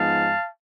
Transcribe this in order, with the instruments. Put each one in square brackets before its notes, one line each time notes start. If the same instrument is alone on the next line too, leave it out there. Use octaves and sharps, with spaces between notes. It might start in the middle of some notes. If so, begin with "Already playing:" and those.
Already playing: [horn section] G#2 F3 G#3 B3 F5 A5